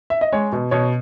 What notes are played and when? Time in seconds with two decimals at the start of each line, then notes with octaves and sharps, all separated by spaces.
0.10 E5
0.21 D#5
0.32 G#3 C#5
0.52 B2
0.71 B2 C#5